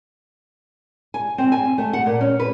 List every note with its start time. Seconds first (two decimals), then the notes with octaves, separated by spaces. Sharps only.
1.14 G#5
1.38 C4
1.52 G#5
1.78 A3
1.93 F#5
2.06 A#2
2.21 C#4
2.40 B4